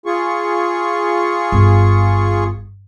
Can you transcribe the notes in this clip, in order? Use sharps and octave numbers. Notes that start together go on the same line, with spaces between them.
F4 G#4 C#6
G1